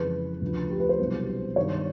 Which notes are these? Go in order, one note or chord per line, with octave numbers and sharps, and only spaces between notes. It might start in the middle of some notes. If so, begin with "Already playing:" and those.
Already playing: F2 C#3 E3 G#3 B4
D2 C#3 F3
G4
B4
C5
C2 B2 F#3 B3
G2 D#3 G3 C#5